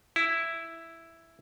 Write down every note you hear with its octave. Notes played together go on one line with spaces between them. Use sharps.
E4